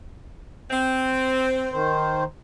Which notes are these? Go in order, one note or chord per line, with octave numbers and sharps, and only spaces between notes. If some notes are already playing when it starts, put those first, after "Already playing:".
C4
D#3 C5